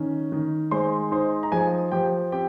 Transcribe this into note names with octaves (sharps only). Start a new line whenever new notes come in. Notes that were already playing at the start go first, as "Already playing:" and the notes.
Already playing: D#3 C#4
D#3
G#3 C5 C6
D#4 C5 C6
A#5
F3 G#4 G#5
F3 G4 G5
C4 G4 G5